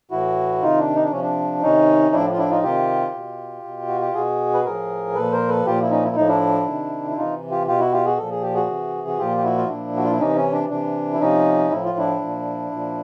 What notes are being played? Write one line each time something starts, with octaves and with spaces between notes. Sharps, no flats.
A2 E3 E4 F#4
C3 D#3 D#4 F4
D4
D#4
D4
C3 F3 C#4
D4
C3 D#3 C#4 D#4
A2 F3 D4 E4
F4
D4 E4
D#4 F4
C3 D#3 F4 G4
B2
B2
F#4
G4
B2 F#4 G#4
B4
A2 F3 G#4 A#4
A#2 F3 A4 B4
A#4 C5
A4 B4
A#2 F3 F4 G4
E4
C#4 D#4
E4
A2 F3 D#4
D4 E4
C3 D#3
E4
C3 E3 D#4 F4
F4 G4
B2 F4 G4
E4 F#4
F4 G4
F#4 G#4
A#2 F3 A4
G#4
G4
F#4 G#4
C3 E3
F#4
A#2 F3 F4 G4
G4
E4 F#4
F4
A#2 F3 D4 E4
F#4
F4
E4
C3 E3 C#4 D#4
C#4
D4
C3 E3 D4
E4
C3 F3 C#4 D#4
A2 F3 E4
F4
D4 E4
A#2 F3
A#2 F3